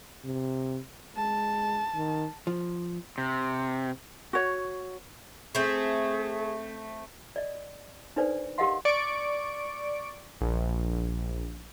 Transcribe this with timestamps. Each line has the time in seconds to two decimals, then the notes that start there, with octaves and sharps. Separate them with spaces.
0.25 C3
1.16 G#3 A5
1.96 D#3
2.47 F3
3.18 C3
4.33 F#4 C#5
5.55 A3 C4 G#4
7.36 D5 D#5
8.16 D4 D#4 A4 B4 C5 D5
8.58 G4 A#4 D#5 F5 F#5 C6
8.85 D5 C#6 D7
10.41 A#1